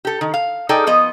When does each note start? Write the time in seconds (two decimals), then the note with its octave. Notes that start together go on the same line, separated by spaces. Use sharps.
0.05 G4 A4
0.21 D#3
0.34 F5
0.69 D#4 G#4 A4 D5 G5
0.87 F3 B3 D#5